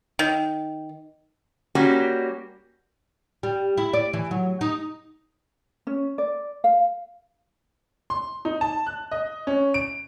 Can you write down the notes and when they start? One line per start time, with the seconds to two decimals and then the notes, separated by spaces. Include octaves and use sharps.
0.19 D#3
1.75 G3 A#3 C#4 F#4 G4
3.43 G3
3.78 E4
3.93 D5
4.13 E3
4.31 F#3
4.61 D#4
5.87 C#4
6.18 D5
6.64 F5
8.10 C6
8.45 D#4
8.61 A5
8.86 F#6
9.12 D#5
9.47 C#4
9.74 D7